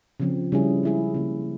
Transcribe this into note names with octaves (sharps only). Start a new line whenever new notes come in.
C#3 F3 C4
C#3 G3 C#4 E4 G#4
G#3 E4 G#4
C#3 F3 A#3